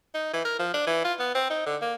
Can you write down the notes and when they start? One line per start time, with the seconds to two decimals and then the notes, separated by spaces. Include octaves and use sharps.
0.15 D#4
0.33 E3
0.45 A#4
0.59 F3
0.74 D4
0.87 E3
1.04 F4
1.20 B3
1.35 C4
1.50 D#4
1.66 D3
1.82 A#3